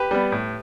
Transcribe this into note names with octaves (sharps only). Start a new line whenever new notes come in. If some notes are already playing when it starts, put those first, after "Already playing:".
Already playing: G4 B4
G3 B3
A2